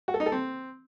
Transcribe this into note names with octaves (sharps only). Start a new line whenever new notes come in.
F#4
A4
D#4
A4
C4